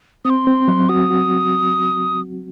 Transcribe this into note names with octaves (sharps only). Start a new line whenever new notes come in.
C4 D#6
C6
C4
F#3
F#4 D#6
F#4